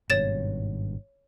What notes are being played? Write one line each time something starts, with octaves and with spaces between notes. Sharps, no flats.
G#1 G2 B2 C#5 A6 E7